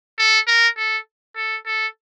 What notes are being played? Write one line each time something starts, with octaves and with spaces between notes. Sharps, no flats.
A4
A#4
A4
A4
A4